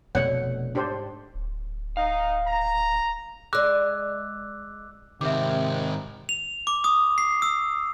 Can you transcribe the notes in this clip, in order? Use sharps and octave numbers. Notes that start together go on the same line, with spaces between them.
F1 B2 A3 C#5 D5 F#5
G#2 D4 G4 C5
D1
D#4 F5
A#5
G#3 D5 D6 E6 F#6
G#2 C3 D#3 E5 D6
F7
D6
D#6
C7
E6